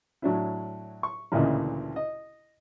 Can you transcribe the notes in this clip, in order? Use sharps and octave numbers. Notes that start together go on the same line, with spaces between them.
A2 F#3 D4 E4
C#6
A1 D2 A#2 C#3 D#5
D#5